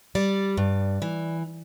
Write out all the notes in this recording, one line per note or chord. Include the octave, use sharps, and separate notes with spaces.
G3 D5
G2
E3